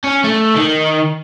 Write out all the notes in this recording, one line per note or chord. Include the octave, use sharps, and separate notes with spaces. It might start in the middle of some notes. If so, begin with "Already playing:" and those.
C#4
A3
D#3